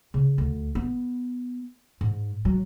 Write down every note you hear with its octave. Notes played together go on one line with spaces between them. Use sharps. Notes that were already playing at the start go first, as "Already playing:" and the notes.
C#3
D2
B3
G#2
F#3